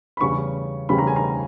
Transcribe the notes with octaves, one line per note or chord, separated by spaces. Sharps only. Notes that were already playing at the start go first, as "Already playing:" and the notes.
B5
E2 C#3 G3 C#4 C#6
E2 C#3 G3 C#4 B5
A#5
G#5
A#5